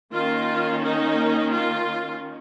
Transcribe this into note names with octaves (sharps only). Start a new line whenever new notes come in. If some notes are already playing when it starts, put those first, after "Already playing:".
D#3 A#3 C#4 F4
D#4
F4